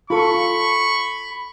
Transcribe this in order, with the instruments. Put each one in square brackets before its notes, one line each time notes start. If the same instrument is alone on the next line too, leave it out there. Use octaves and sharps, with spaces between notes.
[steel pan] F4 A4 [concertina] B5 [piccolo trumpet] C#6